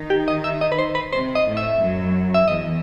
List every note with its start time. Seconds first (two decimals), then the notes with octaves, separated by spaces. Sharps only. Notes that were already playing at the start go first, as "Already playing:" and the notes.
Already playing: D#3 D#4
0.10 G4
0.28 D#5
0.44 E5
0.61 D#5
0.72 B4
0.79 C5
0.95 B4
1.13 C3 C4 C5
1.35 D#5
1.46 A2 A3
1.57 E5
1.80 F#2 F#3
2.34 E5
2.48 E2 E3 D#5